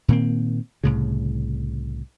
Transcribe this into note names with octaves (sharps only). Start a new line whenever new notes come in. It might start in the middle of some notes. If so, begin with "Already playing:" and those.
A#2 D#3 A#3 C4
C2 A2 C#3